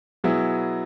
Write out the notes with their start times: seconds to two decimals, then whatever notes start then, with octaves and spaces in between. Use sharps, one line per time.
0.24 B2 F#3 B3 E4 G#4